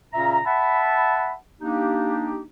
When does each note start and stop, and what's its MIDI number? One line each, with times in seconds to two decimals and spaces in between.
0.13 0.38 46
0.13 0.38 49
0.13 0.38 61
0.13 0.38 76
0.13 0.38 82
0.44 1.32 76
0.44 1.32 78
0.44 1.32 81
0.44 1.32 83
1.61 2.42 58
1.61 2.42 62
1.61 2.42 63
1.61 2.42 67